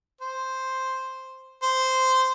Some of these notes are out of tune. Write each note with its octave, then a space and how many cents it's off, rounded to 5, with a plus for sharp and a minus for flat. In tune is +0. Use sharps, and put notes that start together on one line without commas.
C5 +0
C5 -10